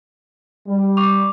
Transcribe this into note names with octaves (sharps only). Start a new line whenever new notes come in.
G3
C#6 D6 F7